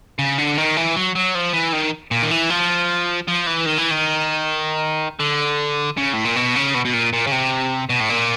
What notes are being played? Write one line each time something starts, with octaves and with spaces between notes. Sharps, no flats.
C#3
D3
D#3
E3
F#3
F#3
F3
E3
D#3
A#2
D#3
E3
F3
F3
E3
D#3
E3
D#3
D3
C#3
A2
A#2
B2
C#3
B2
B2
A#2
A#2
C#3
C3
B2
A2
A#2